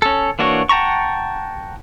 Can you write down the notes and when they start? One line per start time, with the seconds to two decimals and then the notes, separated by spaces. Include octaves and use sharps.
0.02 C#4 A4
0.39 E3 A#3 D4 F#4 C#5
0.69 F#5 G5 A5 A#5 C#6